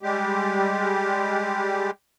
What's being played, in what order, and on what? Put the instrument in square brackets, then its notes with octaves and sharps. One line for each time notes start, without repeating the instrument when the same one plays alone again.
[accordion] G3 G#3 G4